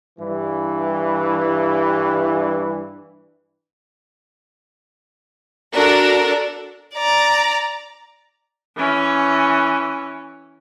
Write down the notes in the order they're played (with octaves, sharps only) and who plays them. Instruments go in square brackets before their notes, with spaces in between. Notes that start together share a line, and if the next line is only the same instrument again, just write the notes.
[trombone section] G2 E3
[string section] D4 F#4 A4 A#4 D5
[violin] D5 A#5
[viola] E3 C#4